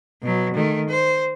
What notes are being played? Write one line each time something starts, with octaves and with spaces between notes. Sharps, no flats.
B2 F#3
D#3 A3
C5